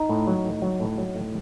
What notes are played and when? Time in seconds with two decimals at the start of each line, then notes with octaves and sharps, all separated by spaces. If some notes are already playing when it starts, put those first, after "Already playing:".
Already playing: D#4
0.09 A2
0.27 F#3
0.44 A2
0.62 F#3
0.80 A2
0.98 F#3
1.15 A2